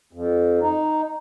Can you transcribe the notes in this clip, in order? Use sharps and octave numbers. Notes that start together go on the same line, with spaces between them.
F2
D#4